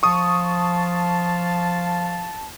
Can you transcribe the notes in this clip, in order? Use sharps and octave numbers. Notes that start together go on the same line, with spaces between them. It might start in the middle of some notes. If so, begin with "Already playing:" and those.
F3 F5 A5 C#6 D#6